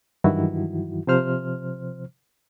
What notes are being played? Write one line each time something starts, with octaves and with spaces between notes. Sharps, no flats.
G2 D#3 E3 F#3 E4 F#4
C3 F3 C5 F6